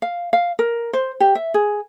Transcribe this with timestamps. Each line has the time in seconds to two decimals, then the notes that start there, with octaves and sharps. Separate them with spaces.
0.02 F5
0.33 F5
0.59 A#4
0.93 C5
1.20 G4
1.35 E5
1.54 G#4